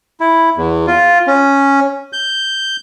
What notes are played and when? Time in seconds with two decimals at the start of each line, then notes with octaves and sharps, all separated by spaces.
0.20 E4
0.57 E2
0.87 F4
1.27 C#4
2.13 G6